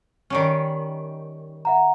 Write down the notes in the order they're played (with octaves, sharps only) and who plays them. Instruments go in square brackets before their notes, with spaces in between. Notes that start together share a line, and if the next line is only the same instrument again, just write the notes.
[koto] D#3 G3 C#4
[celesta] E5 F#5 A#5